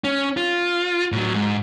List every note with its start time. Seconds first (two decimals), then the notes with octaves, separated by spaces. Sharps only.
0.04 C#4
0.37 F4
1.12 A2 F#3
1.34 G#2